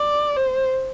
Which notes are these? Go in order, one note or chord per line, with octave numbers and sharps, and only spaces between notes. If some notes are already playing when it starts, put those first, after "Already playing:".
Already playing: D5
C5